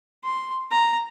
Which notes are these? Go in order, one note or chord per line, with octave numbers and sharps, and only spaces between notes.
C6
A#5